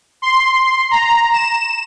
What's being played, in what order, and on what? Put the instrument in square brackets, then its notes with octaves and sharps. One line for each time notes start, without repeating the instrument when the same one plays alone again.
[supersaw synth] C6
A#5
E7